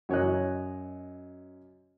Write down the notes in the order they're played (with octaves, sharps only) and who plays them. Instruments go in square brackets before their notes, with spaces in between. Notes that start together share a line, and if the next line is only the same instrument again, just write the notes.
[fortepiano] F#2 C#5 D#5 F#6